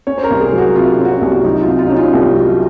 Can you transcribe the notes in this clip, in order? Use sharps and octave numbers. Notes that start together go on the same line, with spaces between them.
C#4 C#5
C5
A#4
C2
G#4
F#3
F#4
C3 F4
C#4
F#4
F4
C2
F#3 D#4
F4
C3
F4
C#4 D#4
F4
C2
F#3